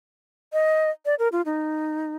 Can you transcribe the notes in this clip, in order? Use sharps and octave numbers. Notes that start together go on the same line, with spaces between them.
D#5
D5
A#4
F4
D#4